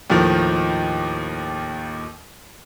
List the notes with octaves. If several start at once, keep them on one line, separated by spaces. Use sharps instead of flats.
D#2 A2 D#3 F3